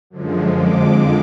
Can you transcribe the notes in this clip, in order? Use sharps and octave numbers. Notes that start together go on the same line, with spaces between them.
F#2 D3 F3 G#3
F2 D3 F3 G#3 D6